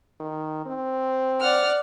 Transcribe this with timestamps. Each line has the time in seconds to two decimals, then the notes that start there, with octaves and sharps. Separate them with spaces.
0.20 D#3
0.66 C4
1.40 D5 F#5 F6